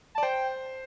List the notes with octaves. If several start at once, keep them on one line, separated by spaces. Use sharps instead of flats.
D5 A5
C5 G5